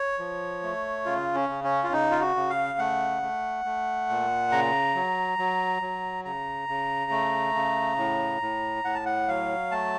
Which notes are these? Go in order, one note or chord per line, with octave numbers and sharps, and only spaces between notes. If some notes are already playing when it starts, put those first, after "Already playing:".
Already playing: C#5
F3
A3
C#3 F4
C#4
C#3
C#4
F4
C#3 D#4
F4
F#4
C#3
F5
A3 F#5
A3
A3
A#2
C#3 A#5
F#3
F#3
F#3
C#3 A#5
C#3
A3
C#3
A2
A2
A2 F#5
A5
F#5
F#3 F5
A3 A5